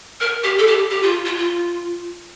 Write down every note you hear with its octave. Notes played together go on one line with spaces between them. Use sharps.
A#4
G4
A4
G4
G4
F4
F4
F4